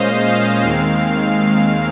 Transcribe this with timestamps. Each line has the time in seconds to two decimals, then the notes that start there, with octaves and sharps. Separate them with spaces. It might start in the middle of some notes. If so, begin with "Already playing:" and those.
Already playing: A#2 G#3 C#4 C5 D#5 F5
0.28 F5
0.63 D#2 D#3 G#3 C4